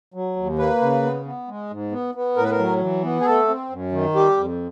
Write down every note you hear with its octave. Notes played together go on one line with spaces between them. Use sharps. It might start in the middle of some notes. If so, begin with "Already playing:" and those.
F#3
D#2
A#3 B4
C#3
B3
B3
G#3
G#2
B3
B3
A2 A#4
B4
A#4
F#3
E3
B3
G#4
A3 A4
C4
F#2
D#3
G3 G4
F2